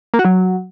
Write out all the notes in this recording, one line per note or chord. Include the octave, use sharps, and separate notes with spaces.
A#3
F#4
F#3